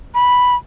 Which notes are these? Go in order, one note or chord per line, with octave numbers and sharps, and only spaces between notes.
B5